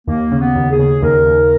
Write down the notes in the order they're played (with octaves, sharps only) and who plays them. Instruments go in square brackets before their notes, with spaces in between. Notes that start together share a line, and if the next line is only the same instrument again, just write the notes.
[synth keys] D#2 [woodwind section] A#3
[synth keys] C#3
[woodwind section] B3
[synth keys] D#2
[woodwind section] G#4
[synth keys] C#3
[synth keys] D#2 [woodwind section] A#4
[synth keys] D#2